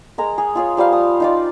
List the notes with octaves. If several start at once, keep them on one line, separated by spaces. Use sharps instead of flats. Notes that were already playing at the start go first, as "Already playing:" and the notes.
G#3 A#4 A#5
G#4
F4 G#4 C#5
F3 G3 C5 F5
D#6
D#4 F4 D5